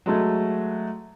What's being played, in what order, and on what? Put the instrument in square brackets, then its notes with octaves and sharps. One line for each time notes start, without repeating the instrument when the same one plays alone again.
[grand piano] F#3 G#3 A3